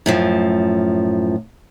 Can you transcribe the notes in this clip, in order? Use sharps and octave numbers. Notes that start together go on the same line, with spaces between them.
F#2 A2 F3